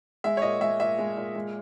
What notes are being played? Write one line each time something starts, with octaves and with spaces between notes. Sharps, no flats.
G#3 E5
C#5
A#2 D#5
G#3 E5
A#2 E5
G#3
A#2
G#3